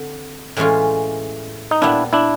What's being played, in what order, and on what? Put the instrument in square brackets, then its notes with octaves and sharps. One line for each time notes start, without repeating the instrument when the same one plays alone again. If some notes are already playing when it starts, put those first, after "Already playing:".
Already playing: [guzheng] D3 C4
A2 E3 G#3 C#4 F4
[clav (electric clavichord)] D#4
[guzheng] A#2 G3 B3 [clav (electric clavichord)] D4 E4
[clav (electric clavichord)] D4 E4